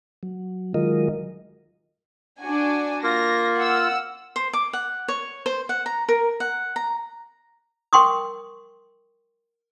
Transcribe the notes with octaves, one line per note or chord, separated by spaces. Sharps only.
F#3
D#3 F#3 G#3 F4 A#4 D#5
D4 F#4 G#5
A#3 F4 A#6
F#5 E6
C5
D6
F#5
C#5
C5
F#5
A#5
A#4
F#5
A#5
A#4 G5 C6 C#6 D#6